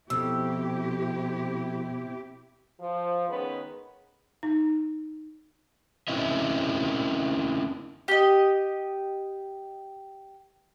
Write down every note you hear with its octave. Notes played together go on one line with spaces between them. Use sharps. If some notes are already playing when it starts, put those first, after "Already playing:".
F2 B2 C4 E4 G4 E6
F3
D#3 G#3 B3 C#4 B4
D#4
C4 C#4 E4 A#4 D#5 E5
G4 D#5